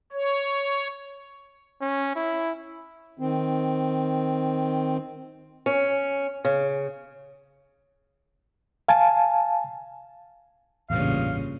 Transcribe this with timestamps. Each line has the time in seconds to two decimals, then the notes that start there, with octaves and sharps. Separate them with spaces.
0.12 C#5
1.81 C#4
2.15 E4
3.19 D#3 C4
5.66 C#4
6.45 C#3
8.88 F5 G#5 A5
10.90 A1 E2 G2 A#2 C#3 F5